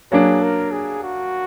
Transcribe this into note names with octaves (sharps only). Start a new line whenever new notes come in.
F#3 A#3 D4 G#4
A#4
G#4
F#4